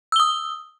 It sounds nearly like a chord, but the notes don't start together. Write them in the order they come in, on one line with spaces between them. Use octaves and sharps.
E6 G7 D#6